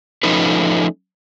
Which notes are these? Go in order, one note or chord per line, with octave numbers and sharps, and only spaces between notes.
F3 A3 C#4 D#4 B4